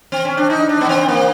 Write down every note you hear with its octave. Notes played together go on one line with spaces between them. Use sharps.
C4
C#4
D4
D#4
D4
B3
C4
A#3